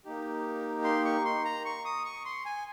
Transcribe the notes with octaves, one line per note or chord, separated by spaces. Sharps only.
A#3 D#4 G4
C6
C#6
C6
A#5
C#6
D#6
C#6
C6
G#5